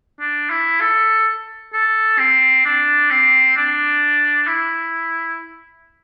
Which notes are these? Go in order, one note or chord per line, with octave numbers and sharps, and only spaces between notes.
D4
E4
A4
A4
C4
D4
C4
D4
E4